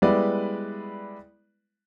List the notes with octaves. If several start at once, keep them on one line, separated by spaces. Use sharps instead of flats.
G3 G#3 B3 E4 B4 D5